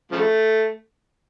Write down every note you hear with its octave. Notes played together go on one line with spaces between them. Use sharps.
C#3 F3 A3